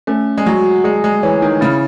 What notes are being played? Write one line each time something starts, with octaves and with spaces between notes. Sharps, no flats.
A3 C#4
G#3
F#3 F#4
G#3 G#4
G#3
E3 C#5
D#3
C#3 E4